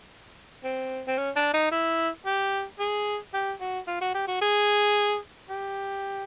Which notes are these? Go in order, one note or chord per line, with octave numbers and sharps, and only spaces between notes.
C4
C4
C#4
D4
D#4
E4
G4
G#4
G4
F#4
F4
F#4
G4
F#4
G#4
G4